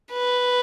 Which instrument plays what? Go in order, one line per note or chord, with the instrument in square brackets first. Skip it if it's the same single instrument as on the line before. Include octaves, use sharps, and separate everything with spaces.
[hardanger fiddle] B4